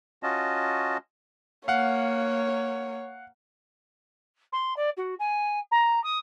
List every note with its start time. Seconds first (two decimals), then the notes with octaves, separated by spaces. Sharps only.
0.23 C#4 F4 F#4 D#5 A5
1.68 A#3 C#5 F5 F#5
4.53 C6
4.77 D5
4.97 F#4
5.20 G#5
5.72 A#5
6.04 D#6